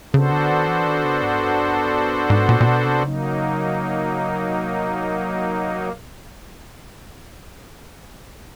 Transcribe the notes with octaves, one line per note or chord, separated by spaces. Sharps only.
C#3 B3 D4 F#4 A4 C5
D3
D#3
E3
D#3
C#3
G#2
G2
G#2
A#2
A#2
B2
C3
C#3 F#3 A#3 D#4
C3
B2